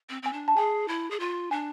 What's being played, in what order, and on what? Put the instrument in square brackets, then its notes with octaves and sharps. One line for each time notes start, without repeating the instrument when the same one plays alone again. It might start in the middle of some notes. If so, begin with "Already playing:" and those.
[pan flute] C4
[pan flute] C4 [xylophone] G#5
[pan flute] D4
[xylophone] A5
[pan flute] G#4 [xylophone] G#5
[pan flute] E4
G#4
F4
[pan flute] D4 [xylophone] G#5